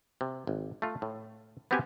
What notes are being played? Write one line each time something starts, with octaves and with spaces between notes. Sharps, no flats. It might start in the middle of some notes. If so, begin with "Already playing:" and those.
C3
G#1
A3 F4
A2
B3 C4 F#4 G4 F#5 G#5